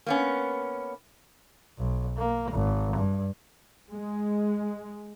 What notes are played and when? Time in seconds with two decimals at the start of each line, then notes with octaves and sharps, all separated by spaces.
0.06 A#3 B3 C#4
1.78 B1
2.17 A#3
2.51 G#1
2.96 G2
3.90 G#3